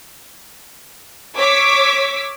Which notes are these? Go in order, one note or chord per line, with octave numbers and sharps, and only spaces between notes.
C#5 D6 E6 B6